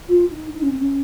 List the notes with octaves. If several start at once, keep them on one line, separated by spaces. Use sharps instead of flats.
F4
D#4
D#4
C#4
C4
C#4